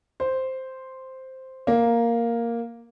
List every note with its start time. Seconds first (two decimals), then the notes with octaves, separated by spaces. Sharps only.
0.20 C5
1.67 A#3